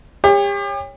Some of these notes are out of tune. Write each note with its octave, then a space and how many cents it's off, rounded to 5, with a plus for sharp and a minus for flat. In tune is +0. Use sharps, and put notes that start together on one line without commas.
G4 +40 C#5 +0